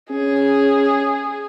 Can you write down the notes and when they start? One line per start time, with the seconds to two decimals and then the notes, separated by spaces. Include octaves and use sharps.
0.11 C#4 G#4